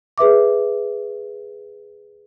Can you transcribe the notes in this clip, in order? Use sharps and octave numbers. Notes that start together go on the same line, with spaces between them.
G#4 B4 E5 D6